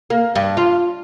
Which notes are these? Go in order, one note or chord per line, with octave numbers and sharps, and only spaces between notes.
A#3
G2
F4